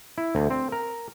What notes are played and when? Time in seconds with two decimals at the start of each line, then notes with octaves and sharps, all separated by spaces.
0.18 E4
0.35 D2
0.50 C4
0.72 A#4